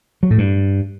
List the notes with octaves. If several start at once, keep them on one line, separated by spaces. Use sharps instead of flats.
F#3
A2
G2